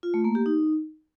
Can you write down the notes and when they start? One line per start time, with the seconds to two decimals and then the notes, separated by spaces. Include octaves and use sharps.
0.03 F4
0.14 A3
0.24 A#3
0.35 G4
0.46 D#4